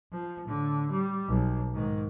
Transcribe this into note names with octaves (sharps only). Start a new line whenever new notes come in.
F3
A2 D3
G3
B1
G#2 D#3